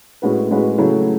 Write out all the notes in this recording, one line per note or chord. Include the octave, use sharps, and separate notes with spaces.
A2 G#3 C#4 F#4 B4
A2 G#3 C#4 F#4 B4
C#3 F#3 A3 E4